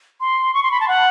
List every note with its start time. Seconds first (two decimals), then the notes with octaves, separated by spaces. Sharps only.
0.21 C6
0.54 C#6
0.63 C6
0.71 B5
0.80 A5
0.88 F#5